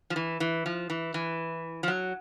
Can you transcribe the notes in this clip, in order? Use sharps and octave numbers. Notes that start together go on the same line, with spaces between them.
F3
E3
E3
F3
E3
E3
F3
F#3